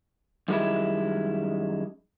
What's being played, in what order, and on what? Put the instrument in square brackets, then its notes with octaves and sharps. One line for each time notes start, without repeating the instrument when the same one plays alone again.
[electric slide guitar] F#2 D#3 G3 G#3 E4